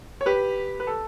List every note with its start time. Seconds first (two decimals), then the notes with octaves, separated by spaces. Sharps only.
0.21 C#5
0.26 G4 B4
0.80 B4
0.87 A4